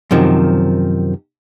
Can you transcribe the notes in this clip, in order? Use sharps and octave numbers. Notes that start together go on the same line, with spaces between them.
F#2 C3 D#3 F3